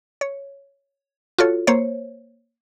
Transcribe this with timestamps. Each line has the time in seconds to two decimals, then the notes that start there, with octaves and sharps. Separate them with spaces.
0.21 C#5
1.38 F4 F#4 A4 C#5
1.67 A#3 C5 C#5